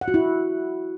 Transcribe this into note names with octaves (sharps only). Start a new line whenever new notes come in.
F#5
F#4
E4